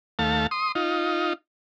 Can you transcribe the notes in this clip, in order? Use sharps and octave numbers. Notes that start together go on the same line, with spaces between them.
D#2 A3 F5 A5
C6 D#6
D#4 F4